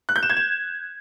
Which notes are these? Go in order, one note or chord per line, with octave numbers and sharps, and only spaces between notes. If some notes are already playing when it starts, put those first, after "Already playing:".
F#6
G6
E7
G#6
E7